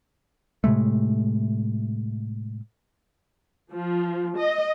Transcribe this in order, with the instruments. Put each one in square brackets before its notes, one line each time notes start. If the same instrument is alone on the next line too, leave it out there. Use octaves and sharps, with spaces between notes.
[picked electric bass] A2 C3 G#3 A3
[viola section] F3
D#5